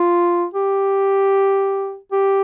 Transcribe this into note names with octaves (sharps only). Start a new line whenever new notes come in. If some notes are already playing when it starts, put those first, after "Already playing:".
Already playing: F4
G4
G4